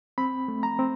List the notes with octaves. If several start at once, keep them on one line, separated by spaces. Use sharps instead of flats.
C4 B5
A3
A#5
C4